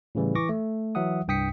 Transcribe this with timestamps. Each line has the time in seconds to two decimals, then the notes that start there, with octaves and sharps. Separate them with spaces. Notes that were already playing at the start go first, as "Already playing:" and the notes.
0.15 A2 C#3 E3 G3
0.35 E3 C#6 D6 A#6
0.49 A3
0.95 E3 F#3 E5 F#5 D#6
1.28 C2 G2 G5 D#6 B6 C#7